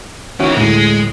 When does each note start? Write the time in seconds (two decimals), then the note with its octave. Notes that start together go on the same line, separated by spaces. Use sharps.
0.40 E3 C#4 D#4 F#4
0.57 D2 A2 G#3